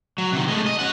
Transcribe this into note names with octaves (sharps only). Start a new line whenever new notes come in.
F#3
C3 D#3
G#3 A3
D#5
C#4 F#5